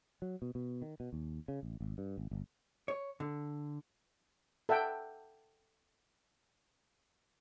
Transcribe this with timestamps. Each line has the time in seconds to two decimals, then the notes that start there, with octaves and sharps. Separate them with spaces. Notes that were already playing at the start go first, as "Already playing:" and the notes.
0.22 F#3
0.42 B2
0.55 B2
0.82 D#3
1.00 B2
1.13 D#2
1.48 C#3
1.63 A1
1.80 G#1
1.98 G2
2.18 G#1
2.31 G1
2.88 C#5
3.20 D3
4.69 A4 E5 F#5 G5